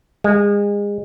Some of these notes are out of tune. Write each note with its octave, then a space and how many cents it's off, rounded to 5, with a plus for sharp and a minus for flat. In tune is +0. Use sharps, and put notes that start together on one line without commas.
G#3 -30